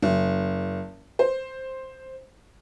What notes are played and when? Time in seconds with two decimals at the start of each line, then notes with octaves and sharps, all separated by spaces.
0.02 F#1
1.19 C5